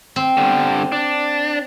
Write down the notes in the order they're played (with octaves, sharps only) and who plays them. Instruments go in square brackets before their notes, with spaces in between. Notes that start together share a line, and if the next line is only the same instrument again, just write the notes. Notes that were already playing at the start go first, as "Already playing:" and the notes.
[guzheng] C4
[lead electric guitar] D3 G3
D4